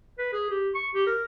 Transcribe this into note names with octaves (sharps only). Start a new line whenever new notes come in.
B4
G#4
G4
C#6
G4
A#4